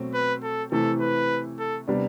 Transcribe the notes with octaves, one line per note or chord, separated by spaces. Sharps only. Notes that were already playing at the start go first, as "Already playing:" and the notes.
Already playing: B2 F#3 A3 C4
B4
A4
C3 E3 A3 A4
B4
A4
C3 G3 B3 D4